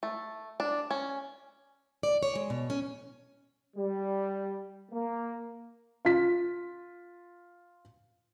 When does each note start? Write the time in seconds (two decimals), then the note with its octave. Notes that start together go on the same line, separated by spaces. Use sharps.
0.03 A3
0.60 D4
0.91 C#4
2.03 D5
2.23 C#5
2.35 G#3
2.50 B2
2.70 C#4
3.76 G3
4.91 A#3
6.05 F4 B6